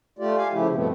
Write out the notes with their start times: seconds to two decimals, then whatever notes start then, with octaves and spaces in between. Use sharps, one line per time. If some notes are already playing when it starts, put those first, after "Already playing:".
0.19 A3 F4 G4 D5
0.37 G4 F5 G#5
0.52 C#3 F3 A3 E4 G4
0.73 G2 B2 F3 A3 B3 C4